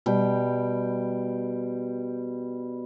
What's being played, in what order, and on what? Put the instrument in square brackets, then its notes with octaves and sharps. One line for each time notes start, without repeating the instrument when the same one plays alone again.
[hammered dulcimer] B2 G3 G5